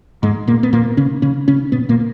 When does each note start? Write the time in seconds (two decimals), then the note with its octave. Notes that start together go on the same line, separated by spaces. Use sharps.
0.23 G#2 G#3
0.47 A#2 A#3
0.63 B3
0.73 A#2 A#3
0.97 C#3 C#4
1.22 C#3 C#4
1.48 C#3 C#4
1.72 B2 B3
1.89 A#2 A#3